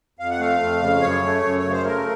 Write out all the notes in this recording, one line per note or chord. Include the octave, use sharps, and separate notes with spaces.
F2 F5
F#5
A3 F5
F2
C#3
F#2 C#5
A3
F#2
C#5
C#3
C5
A3 A#4